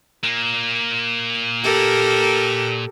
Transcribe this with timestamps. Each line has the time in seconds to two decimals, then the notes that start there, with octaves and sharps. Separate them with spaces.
0.24 A#2 A#3
1.64 G4 A4 A#4